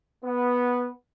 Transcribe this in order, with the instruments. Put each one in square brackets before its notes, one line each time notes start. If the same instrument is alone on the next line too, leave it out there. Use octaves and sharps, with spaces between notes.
[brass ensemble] B3